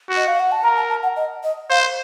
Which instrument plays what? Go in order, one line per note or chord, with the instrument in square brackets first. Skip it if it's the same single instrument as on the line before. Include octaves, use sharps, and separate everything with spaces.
[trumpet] F#4
[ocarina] D#5
F5
F#5
A5
[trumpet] A#4 [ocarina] A#5
[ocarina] A5
A5
F#5
D#5
D#5
[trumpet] C5 [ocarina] F5